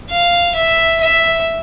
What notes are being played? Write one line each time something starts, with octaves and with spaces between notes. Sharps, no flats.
F5
E5
E5